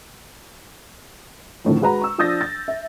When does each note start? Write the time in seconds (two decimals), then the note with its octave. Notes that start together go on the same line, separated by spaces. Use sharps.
1.65 F2 A2 D3 D#3
1.81 G#3 F#4 B4 A#5
2.02 C#6 E6
2.18 F3 D4 D#6 G6 A6 A#6
2.41 A6
2.68 E5